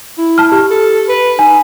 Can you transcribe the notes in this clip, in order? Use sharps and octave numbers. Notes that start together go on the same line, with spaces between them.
E4
A5 F6
G4
A4
B4
D#4 G#5